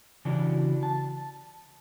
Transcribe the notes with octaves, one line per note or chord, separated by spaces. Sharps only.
C#3 E3 D4 E4 F#4 G4
A5